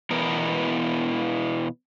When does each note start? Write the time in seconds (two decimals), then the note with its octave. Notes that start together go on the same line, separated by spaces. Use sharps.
0.11 E2 B2 E3 B3 A#4